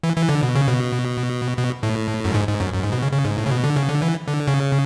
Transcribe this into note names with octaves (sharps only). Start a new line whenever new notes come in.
E3
E3
D3
B2
C#3
B2
B2
A2
F#2
G#2
G#2
F#2
F#2
G#2
B2
C#3
C#3
G#2
A2
C#3
B2
D3
C#3
D3
E3
D3
C#3